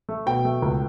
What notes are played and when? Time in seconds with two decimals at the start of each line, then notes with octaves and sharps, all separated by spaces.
0.09 A3
0.26 B2 G5
0.45 A3
0.62 C#2